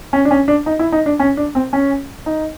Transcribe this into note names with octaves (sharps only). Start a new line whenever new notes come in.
C#4
D4
C#4
D4
D#4
E4
D#4
D4
C#4
D4
C4
C#4
D#4